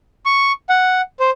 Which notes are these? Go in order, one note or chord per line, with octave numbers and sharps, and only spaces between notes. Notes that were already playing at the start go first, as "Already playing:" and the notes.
C#6
F#5
C5